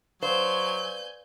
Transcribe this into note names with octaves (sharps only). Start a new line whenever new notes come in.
F#3 B4 C5 D5 F5 G#5 G6